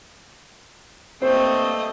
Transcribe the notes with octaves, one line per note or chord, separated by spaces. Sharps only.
G2 A3 A#3 C4 C5 D#5